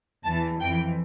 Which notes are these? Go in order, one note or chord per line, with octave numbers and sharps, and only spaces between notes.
E2 E3 A5
F2 E3 G5